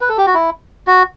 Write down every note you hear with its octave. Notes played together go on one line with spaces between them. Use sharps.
B4
A4
G4
F#4
E4
F#4